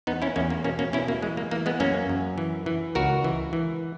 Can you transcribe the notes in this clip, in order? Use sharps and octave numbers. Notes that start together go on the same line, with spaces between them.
E2 B3 D#4
C#4 E4
E2 A#3 C#4
A#3
B2 A#3 C#4
A#3 C#4
B2 C#4 E4
A#3
E3 G#3
A#3
E3 A#3
G#3 B3
F#2 A#3 C#4
F#2
E3
E3
C#2 F#4 A#4
E3
E3